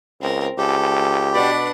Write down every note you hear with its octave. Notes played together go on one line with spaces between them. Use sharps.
C#2 C4 A#4
C#2 G4 A4
B2 D4 D5 F#5 B5